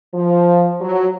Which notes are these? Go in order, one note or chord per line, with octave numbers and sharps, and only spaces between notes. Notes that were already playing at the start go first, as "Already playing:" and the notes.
F3
F#3